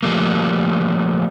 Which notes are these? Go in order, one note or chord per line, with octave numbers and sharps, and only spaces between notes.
F3 G3 A3 A#3